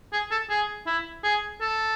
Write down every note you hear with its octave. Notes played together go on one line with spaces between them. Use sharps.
G#4
A4
G#4
E4
G#4
A4